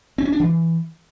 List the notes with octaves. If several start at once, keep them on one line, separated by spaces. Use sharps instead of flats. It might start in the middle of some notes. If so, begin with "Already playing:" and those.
C4
C#4
D4
E3